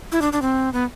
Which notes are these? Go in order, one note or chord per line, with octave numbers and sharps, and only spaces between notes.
E4
D4
D4
C4
B3